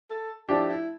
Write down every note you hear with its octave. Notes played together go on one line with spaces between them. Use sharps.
A4
F3 A3 D4 E4 G4
E4